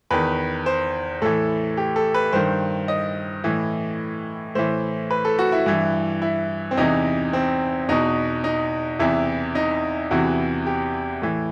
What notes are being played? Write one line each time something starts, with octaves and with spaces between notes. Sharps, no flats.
E2 D#3 B4
C5
A2 E3 A4
G4
A4
B4
G2 D#3 C5
D#5
A2 E3
A2 E3 C5
B4
A4
F#4
E4
G2 E3 E4
E4
C4
E2 C3 E3 D#4
C4
E2 B2 D#4
D#4
E2 C3 E3 E4
D#4
E2 C3 E3 F#4
G4
A2 E3